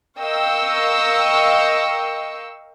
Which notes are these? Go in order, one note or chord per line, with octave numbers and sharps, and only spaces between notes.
A#4 D#5 F5 G5 C#6 E6